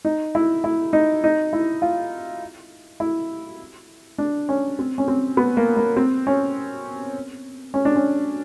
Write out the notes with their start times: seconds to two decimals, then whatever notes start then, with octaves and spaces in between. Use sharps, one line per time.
0.05 D#4
0.35 E4
0.64 E4
0.93 D#4
1.24 D#4
1.53 E4
1.82 F4
3.00 E4
4.18 D4
4.49 C#4
4.79 C4
4.98 C#4
5.08 C4
5.37 B3
5.57 A#3
5.77 A#3
5.97 C4
6.27 C#4
7.74 C#4
7.85 D4
7.96 C#4